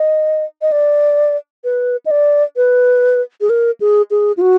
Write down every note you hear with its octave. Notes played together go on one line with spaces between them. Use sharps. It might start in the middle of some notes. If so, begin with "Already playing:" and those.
Already playing: D#5
D#5
D5
B4
D#5
D5
B4
G#4
A#4
G#4
G#4
F4
F#4